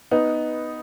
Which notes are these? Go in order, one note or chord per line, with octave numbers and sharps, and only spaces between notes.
B3 D#4